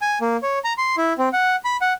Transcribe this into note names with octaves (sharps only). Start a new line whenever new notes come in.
G#5
A#3
C#5
A#5
C6
E4
C4
F#5
B5
F#5